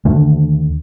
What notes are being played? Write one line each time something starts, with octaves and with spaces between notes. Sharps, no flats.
D#2 D3 A3